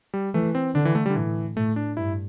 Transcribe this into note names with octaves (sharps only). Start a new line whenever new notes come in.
G3
E3 A3
C4
D3 D4
E3
A3
G3
D3
A2 E3
A2 A3
D4
G2 E4